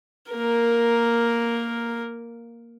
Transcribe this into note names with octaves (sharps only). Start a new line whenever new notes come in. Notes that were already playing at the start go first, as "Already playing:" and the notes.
A#3 A#4